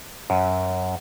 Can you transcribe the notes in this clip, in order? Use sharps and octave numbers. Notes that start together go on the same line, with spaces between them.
F#2